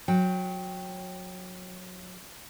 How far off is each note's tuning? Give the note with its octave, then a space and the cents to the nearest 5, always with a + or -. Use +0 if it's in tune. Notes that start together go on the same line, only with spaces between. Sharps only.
F#3 -20 G5 +0